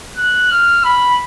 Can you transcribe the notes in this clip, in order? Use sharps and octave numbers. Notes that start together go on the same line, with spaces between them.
F#6
F6
B5